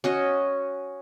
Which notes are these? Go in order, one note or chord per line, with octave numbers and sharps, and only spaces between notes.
C#4 F#4 D#5